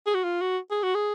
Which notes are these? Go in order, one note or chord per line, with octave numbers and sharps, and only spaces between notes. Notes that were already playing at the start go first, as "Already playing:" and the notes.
G#4
F#4
F4
F#4
G#4
F#4
G#4